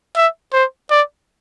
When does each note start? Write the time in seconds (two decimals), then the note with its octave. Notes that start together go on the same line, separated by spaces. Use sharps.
0.16 E5
0.53 C5
0.90 D5